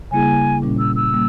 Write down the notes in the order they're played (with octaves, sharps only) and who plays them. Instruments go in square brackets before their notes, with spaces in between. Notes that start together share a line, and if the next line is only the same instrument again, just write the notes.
[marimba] C#3 G3 A#3 E4 G#4 [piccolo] G#5
[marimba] A#2 G3 C#4
[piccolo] E6
E6
[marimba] G3 A#3